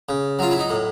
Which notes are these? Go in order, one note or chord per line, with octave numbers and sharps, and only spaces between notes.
C#3
F#3 F4
E4
D#4
A2